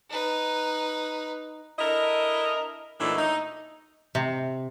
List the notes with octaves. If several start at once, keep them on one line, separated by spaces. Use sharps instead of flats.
D#4 B4
D4 E4 A4 A#4 D#5
A#2 E3 F#3 A3 D4 D#4
D#4
C3